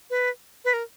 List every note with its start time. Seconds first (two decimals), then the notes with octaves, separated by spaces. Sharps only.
0.10 B4
0.65 B4
0.73 A#4